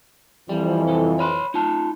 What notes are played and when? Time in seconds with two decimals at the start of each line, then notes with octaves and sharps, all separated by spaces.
0.49 F2 E3 G3
0.88 C2 A4
1.19 C#5 B5 C6
1.54 D#4 F4 A5